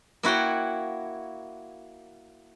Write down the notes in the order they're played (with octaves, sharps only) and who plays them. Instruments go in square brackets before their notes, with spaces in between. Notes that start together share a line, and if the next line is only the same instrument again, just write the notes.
[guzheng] A#3 E4 F#4 C#5 G5